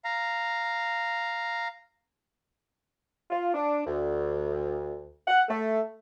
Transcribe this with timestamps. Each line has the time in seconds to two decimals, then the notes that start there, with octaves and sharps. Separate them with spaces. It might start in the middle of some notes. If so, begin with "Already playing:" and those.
0.05 F5 A#5
3.31 F4
3.54 D4
3.86 D2
5.28 F#5
5.49 A3